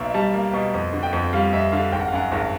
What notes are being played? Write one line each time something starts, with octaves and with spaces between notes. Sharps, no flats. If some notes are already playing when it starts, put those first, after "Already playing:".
Already playing: B1 B2 A#3 E5
G3 A5
A#3
B2
F2
D3
G5
F2
G3 F5
F2 E5
D3 F5
G#1 G5
F#5
F5
F#2 F#5
G#1